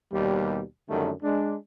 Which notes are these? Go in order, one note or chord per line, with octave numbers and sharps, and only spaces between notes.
D#2 B2 G3
F#2 D3 D#3 G3 A3
G#3 D4